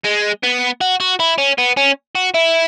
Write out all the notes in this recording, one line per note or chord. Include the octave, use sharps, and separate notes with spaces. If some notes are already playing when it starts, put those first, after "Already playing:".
G#3
B3
F#4
F#4
E4
C#4
B3
C#4
F#4
E4